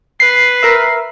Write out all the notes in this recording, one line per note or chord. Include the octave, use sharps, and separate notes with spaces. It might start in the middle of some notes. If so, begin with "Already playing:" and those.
B4 C7
A#4 E5